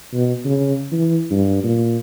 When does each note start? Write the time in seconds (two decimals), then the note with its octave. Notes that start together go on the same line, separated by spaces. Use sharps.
0.13 B2
0.45 C#3
0.92 E3
1.31 G2
1.63 A#2